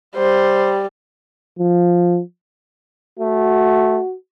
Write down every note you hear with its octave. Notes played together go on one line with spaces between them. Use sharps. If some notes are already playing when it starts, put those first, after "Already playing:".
G3 C5
F3
A3 F#4